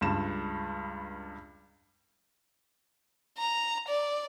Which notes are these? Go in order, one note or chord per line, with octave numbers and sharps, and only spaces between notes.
C#2 G2 E7
A#5
D5